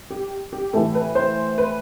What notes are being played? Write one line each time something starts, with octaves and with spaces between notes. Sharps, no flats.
G4
G4
A2 E3 A4
B4
C5
B4